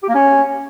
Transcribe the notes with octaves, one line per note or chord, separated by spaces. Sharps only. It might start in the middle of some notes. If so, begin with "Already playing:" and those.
G4
A#3
C#4